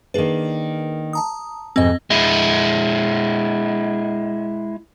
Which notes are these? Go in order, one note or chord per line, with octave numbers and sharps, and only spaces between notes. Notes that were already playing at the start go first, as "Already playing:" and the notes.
D#3 A#3 D4 G#4 B4
A5 A#5 D#6
F2 G#2 B2 C4 D#5
G#3 E4